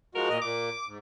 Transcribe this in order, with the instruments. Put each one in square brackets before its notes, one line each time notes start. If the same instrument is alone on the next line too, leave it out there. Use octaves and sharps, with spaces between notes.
[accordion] F3 G#3 F#4 [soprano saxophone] A#4
[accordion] A#2 D#5
[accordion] A#2 [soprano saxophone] D6
[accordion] G#2